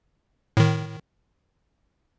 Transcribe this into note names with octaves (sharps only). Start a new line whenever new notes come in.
A2 D#3